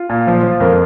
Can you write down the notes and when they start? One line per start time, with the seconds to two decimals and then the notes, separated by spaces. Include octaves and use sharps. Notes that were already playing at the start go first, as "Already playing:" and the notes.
Already playing: F4
0.09 A#2
0.27 F3
0.43 F3
0.60 F2 A#4